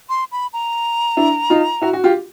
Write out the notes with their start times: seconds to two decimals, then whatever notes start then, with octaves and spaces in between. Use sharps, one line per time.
0.09 C6
0.32 B5
0.53 A#5
1.17 D4 E4
1.50 D#4 F4
1.82 E4 F#4
1.93 F#4
2.04 F4 G4